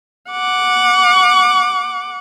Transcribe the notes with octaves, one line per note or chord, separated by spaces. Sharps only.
F#5 D6